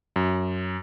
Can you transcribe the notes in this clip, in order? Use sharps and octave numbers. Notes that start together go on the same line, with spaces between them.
F#2